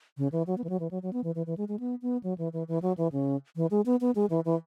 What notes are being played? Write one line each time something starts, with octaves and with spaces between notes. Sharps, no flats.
C#3
E3
F#3
B3
E3
F#3
E3
F#3
F#3
B3
E3
E3
E3
G#3
G#3
B3
B3
F#3
E3
E3
E3
F#3
E3
C#3
E3
G#3
B3
B3
G#3
E3
E3